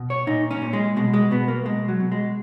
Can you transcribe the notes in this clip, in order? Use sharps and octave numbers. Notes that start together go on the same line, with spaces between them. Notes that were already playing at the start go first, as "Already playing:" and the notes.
Already playing: B2
C#5
A#2 D#4
C#4
A#2
G#3
B2 G#3
G#3
B2 B3
A#3
B2 G#3
F#3
B2
G#3